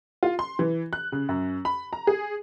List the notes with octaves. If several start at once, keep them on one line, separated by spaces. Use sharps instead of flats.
F4
C6
E3
F#6
C#3
F#2
B5
A#5
G#4